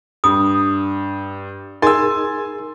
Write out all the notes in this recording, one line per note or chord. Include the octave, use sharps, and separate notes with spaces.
G2 D#6
D#4 G#4 A#4 G#5 C6 E6 A6